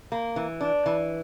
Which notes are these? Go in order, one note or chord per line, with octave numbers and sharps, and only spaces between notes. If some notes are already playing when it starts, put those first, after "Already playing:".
A#3
E3
D4
E3